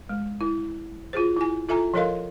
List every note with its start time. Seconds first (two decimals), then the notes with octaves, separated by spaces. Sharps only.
0.09 G#3
0.41 E4
1.13 F4 F#4 G#4 C5
1.36 E4 G#5
1.69 F4 A4 E5 G#5 A#5
1.94 F3 A4 A#4 D#5 F5 C6